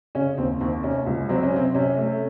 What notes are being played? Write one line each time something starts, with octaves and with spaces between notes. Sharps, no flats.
C#3 C#4
D#2 C4
D#2 C4
C3 C#4
C#2
F#3 C4
C#4
C3 C4
C3 C#4
A3